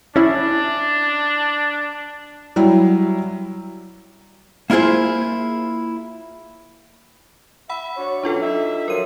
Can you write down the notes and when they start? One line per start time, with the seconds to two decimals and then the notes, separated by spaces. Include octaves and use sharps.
0.16 C#4 D4 E4
2.56 F#3 G3 E4
4.70 A#3 E4 F4 G#4 C5
7.69 E5 F#5 B5
7.97 D4 F#4 C#5
8.23 B2 F#3 C#4 D4 F4 A4
8.41 D#4 E5
8.88 F3 F#3 A#4 D#7